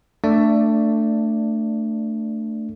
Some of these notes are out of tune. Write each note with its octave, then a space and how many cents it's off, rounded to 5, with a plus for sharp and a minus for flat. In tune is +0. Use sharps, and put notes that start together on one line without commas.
A3 +20 D4 +10 D5 +0